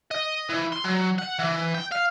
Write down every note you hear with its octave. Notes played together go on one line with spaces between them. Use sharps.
D#5
E3
C6
F#3
F#5
E3
G5
F5